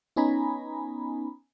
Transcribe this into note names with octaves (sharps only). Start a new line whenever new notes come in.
B3 C#4 D#4 G#5 A#5 B5